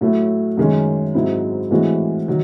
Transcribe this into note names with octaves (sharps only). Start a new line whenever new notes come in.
A2 F#3 A3
F#2 D#3 G#3 C#4
G#2 F#3 C4 E4
A2 E3 G#3 C4 F#4
D#3 F#3